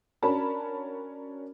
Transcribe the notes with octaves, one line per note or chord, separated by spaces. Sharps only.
C#4 D4 F#4 A#4 A5 B5